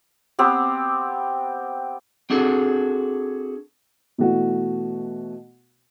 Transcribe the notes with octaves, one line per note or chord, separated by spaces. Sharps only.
B3 C4 G4
C4 D4 F#4 G#4 A4
B2 E3 A3 F#4